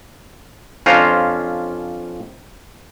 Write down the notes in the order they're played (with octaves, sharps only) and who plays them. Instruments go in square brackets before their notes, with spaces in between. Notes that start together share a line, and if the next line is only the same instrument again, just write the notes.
[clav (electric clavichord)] F2 C#4 D4 F4 C5 A#5